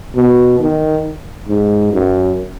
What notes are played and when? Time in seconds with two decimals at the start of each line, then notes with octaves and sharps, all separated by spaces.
0.15 B2
0.60 D#3
1.48 G#2
1.93 F#2